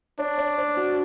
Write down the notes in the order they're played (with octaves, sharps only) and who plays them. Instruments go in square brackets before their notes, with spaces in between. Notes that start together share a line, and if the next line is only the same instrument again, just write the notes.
[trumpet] D4 [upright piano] C#5
[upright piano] C#5
C5
F#4